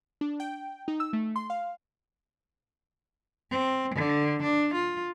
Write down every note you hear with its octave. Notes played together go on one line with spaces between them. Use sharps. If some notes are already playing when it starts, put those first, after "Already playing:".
D4
G5
D#4
E6
A3
C6
F5
C4
D3
D4
F4